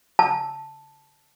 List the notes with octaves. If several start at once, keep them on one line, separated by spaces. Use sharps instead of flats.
A5